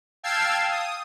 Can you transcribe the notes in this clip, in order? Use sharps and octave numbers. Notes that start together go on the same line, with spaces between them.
F5 G5 A5 E6 G#6 C7
D#6